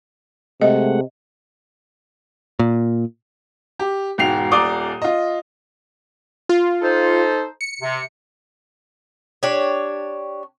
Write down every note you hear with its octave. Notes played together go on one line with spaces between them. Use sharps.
C3 G#3 A3 D#5 F#5
A#2
G4
E1 G#2 G5 C7 F7
D#1 D5 A#5 D6 D#6 G7
F4 D#5
F4
D#4 A4 C5
C#7
C3
D4 G4 C#5